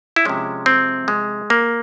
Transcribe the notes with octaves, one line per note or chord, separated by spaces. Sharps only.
E4
C3 F3 G#3 C#4
C4
G#3
A#3